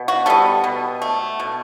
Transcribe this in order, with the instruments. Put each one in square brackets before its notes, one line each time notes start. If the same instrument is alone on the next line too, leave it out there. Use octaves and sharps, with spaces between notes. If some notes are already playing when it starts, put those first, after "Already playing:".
Already playing: [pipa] B2
F#4
G3 B3 A4
B2
A3
B2